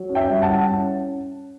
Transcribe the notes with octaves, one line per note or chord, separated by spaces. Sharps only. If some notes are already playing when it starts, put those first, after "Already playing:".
Already playing: F#3
C#4
E5 G5
G2
F#5 A5
E4
C#4